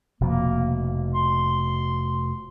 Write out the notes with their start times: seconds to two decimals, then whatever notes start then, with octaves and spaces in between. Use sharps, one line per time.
0.21 F1 B2 F3 A#3
1.14 C6